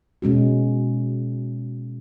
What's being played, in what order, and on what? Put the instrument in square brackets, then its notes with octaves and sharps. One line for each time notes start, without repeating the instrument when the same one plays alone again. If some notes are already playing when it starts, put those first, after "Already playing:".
[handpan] B2 G#3 C#4 F#4